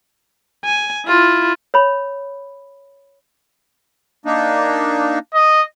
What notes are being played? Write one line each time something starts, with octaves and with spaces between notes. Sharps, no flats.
G#5
E4 F4
C#5 B5
A#3 D4 D#4
D#5